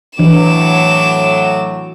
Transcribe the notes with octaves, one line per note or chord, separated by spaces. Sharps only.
A2 E3 F#3 D4 D6 E7